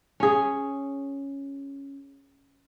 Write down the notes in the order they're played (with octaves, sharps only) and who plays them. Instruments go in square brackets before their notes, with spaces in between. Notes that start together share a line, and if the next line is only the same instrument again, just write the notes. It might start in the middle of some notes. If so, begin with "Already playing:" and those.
[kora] C#4 G#4